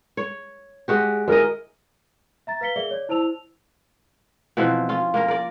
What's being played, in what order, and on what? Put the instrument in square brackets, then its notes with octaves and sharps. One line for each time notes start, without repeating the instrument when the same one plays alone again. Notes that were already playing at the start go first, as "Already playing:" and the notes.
[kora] C#5
G#3 F#4 G4
[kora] G#3 E4 D#5 [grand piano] G#4 A#4
[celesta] E5 A#5 A6
B4 F5 B6 C#7 G7
G#4 A#4 D5 E5 G7
C#5 D5
E4 C5 A5 E6 F7
[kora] B2 E3 F3 C4
C#4 F4
A#3 C#4 A#4
A#4 D5